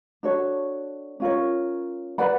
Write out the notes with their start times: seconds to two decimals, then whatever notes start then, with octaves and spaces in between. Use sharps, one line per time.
0.23 D4 F#4 A4 C#5
1.20 C#4 F4 A#4 C#5
2.18 B4 D5 F#5 B5